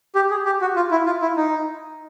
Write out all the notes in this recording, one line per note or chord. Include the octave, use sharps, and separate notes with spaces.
G4
G#4
G4
F#4
F4
E4
F4
E4
D#4